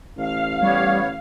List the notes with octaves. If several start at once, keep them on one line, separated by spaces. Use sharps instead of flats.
A1 F5
G3 B3 C#5